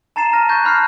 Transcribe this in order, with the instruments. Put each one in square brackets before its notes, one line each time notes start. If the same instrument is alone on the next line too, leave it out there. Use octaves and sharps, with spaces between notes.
[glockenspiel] A5 A#5 A6 C7 E7
A5 F6 A#6
C#6 F#6 G6 A6
A5 B5 F6 F#6 C7